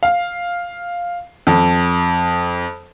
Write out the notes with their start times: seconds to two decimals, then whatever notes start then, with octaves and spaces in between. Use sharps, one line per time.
0.03 F5
1.47 F2